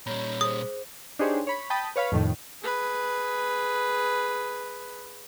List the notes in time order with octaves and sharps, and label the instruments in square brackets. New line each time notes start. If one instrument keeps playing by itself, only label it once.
[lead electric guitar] A#2 G3 [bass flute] C#5 [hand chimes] A#5 B5 G6
[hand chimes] G#4 C5 [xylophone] D#6
[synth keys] D4 D#4 G4 G#4 C5 C#5
C#5 B5
G5 A5 B5 D#6
B4 C#5 F5 B5
F2 A2 D#3
[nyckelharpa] G#4 B4